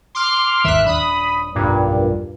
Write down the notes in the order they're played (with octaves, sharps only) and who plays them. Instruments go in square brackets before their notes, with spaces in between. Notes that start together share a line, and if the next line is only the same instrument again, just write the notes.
[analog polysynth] C6 D6 F6
[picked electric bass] G#1 D#2 D#3 [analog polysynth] E5 F#6
[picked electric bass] D#1 D4 [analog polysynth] B5 D#6
[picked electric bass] F1 B1 [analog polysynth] G2 A#2